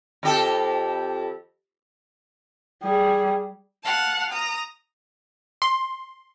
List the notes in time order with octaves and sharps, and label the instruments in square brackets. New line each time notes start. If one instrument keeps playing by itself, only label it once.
[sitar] F2 G4 A4
[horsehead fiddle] G3 G#4
[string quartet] F5 F#5 A5
A#5 D#6
[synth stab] C6